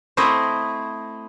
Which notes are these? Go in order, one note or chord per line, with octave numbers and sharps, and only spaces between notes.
A3 C4 E4 C5 D#5